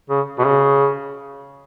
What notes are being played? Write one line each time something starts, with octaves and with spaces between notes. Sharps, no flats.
C#3
B2
C#3